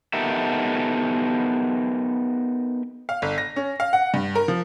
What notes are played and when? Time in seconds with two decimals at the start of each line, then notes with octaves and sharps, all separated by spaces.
0.13 B3 D#4 G4 A4 A#4 E5
3.09 F5
3.22 G1
3.38 A#6
3.56 C#4
3.80 F5
3.93 F#5
4.14 G2
4.35 A#4
4.48 F3